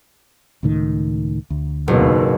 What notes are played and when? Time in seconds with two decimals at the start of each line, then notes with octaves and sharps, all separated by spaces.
0.63 C#2 A2 D#3
1.50 D2
1.88 F#1 D#2 B2